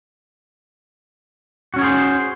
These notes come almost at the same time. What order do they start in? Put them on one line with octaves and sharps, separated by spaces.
F#4 C#4 C#5 G#4 C5